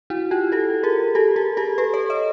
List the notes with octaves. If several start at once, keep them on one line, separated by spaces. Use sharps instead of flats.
E4 F#4
F4 G4
G4 A4
G#4 A#4
G4 A4
G#4 A#4
G4 A4
A4 B4
B4 C#5
C#5 D#5